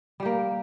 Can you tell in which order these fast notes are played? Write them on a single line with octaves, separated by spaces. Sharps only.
G3 G4 A#3